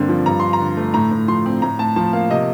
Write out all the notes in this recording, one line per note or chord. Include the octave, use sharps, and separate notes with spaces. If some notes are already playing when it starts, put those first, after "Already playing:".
Already playing: G2 D3 A#3 C4
F3
G2 A#5
D4 C6
A#5
D3
A3
A2 A#5
A2
F3 C6
C4
A2 A#5
A2 A5
F3 A5
A#3 F5
C3 D#5